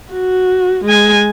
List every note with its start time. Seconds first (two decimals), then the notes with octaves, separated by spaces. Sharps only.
0.13 F#4
0.85 G#3 G#5